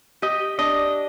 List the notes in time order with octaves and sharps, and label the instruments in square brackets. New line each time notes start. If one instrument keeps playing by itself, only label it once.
[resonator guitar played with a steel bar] G4 [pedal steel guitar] D#5
[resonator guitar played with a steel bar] D4 [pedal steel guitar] D#5